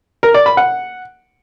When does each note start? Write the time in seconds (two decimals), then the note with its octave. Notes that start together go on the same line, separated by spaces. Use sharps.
0.23 A#4
0.34 D5
0.46 B5
0.57 F#5